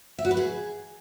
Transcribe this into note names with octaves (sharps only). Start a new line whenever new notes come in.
E5
F#4
B4
G#4